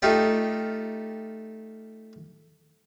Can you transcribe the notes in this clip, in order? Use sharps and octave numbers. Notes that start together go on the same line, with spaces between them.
A3 D#4 F4 G4 D5